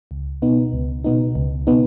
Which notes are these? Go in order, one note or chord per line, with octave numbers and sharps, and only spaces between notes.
C#2
B2 B3 D#4
C#2
B2 B3 D#4
C#2
B2 B3 D#4